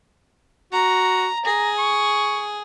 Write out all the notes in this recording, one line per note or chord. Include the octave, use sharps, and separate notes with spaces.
F#4 A#5
G#4 A#5
C#6